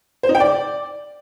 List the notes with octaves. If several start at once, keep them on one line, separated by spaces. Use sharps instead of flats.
C5
D#4
G5
D5